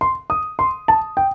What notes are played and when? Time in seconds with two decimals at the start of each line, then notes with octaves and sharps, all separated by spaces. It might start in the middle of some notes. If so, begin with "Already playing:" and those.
0.01 C6
0.30 D#6
0.59 C6
0.88 A5
1.17 G5